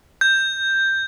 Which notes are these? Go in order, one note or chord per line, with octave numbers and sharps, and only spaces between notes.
G6